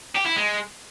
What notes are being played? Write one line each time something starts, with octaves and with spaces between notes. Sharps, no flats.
G4
E4
G#3